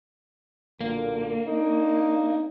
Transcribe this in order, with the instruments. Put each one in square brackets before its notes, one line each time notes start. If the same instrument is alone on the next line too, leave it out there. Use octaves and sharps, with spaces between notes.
[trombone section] B1 A#2 D3 [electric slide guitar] A#3
[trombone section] C4 D4 D#4